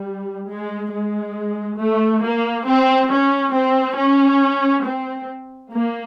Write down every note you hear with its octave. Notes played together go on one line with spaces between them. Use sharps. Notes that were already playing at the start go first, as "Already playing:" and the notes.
Already playing: G3
G#3
G#3
A3
A#3
C4
C#4
C4
C#4
C4
A#3